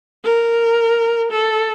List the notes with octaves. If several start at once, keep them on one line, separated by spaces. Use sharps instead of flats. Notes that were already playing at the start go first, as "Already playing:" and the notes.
A#4
A4